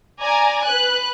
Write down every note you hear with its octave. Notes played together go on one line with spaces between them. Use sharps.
D5 G#5 A#5
B4 F#6